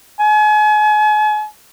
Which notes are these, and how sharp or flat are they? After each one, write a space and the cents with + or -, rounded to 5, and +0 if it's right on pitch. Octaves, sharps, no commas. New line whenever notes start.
G#5 +40